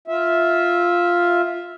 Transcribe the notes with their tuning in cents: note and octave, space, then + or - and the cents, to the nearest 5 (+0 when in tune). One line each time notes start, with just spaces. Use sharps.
F4 +0 E5 -10